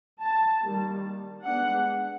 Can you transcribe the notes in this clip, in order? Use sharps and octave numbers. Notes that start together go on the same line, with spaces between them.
A5
D#3 G3 A#3
G#3 B3 D4 F#5